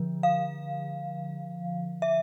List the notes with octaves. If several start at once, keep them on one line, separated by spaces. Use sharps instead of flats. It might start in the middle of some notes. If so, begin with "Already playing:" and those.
Already playing: D3 F3
F5
E5